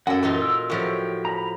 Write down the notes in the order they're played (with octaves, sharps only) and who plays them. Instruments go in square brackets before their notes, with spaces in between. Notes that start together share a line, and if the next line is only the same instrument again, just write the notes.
[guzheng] F#2 A4 [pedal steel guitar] F#5
[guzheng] A#2 D#4 F4 [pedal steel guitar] E3
[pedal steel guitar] A#4 E6
[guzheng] A2 F3 F#3 [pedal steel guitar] G4 G5 C#6
[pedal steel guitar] A#5 B5